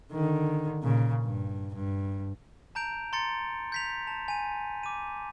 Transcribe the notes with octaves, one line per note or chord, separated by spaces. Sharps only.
D3 D#3
A#2 C#3
G2
G2
A5 A#5 G6 D7 F7
A#5 C6 G6 A6 C#7
G6 B6 F7
A5 F7
G#5 D#7
D6 D#7